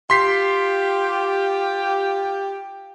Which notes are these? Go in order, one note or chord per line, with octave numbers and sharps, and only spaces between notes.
F4 G4 C6 B6 C7